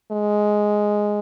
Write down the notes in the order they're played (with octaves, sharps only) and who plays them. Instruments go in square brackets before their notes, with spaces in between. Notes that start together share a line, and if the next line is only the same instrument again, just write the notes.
[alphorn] G#3